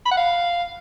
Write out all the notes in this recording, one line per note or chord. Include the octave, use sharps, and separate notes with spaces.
B5
F#5
F5